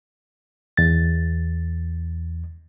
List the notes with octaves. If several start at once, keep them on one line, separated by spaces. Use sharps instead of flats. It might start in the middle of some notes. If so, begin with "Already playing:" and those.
E2 A6